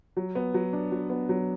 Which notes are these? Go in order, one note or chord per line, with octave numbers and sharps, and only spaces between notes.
F#3
B3
F#3
D4
F#3
B3
F#3